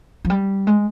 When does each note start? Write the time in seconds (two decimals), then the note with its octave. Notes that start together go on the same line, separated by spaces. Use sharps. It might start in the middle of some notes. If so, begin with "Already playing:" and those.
0.25 F3
0.30 G3
0.67 G#3